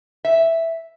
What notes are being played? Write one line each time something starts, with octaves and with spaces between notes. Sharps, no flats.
E5